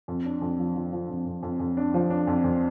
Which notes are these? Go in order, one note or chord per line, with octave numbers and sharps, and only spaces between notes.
F2
D4
F2
F3
F3
F3
F2
F2
F2
F2
D4
F3
D4
F2
F2